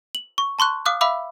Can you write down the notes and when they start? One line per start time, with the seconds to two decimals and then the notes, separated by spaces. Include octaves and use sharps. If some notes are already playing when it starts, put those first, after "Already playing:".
0.15 F#7
0.38 C#6
0.59 A5 C6 C#6 F#6
0.86 F5 D6 D#6 F6 F#6
1.01 E5 F5 B5 D6 E6